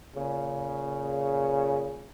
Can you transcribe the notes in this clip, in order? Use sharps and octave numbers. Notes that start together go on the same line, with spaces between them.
A#2 C#3